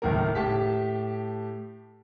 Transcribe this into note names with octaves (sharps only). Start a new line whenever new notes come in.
F#1 D#2 A2 A#3 A#4
A2 G4 A5 B6